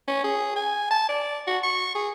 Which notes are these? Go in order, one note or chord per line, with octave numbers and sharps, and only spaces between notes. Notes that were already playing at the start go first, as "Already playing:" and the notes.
C#4
G#4
G#5
A5
D5
F#4
C#6
G#4